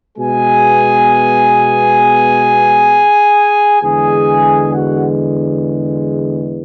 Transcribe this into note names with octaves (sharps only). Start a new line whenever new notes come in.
B2 G#3 B3 G#4 G#5
E2 D3 G#3 G#4 G#5
F#4 F#5